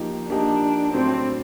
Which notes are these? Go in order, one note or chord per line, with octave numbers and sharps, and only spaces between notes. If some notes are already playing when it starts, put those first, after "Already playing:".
Already playing: F3 A#3 D#4 G4
F3 A#3 D4 D#4 G4
A2 F#3 A3 C4 D4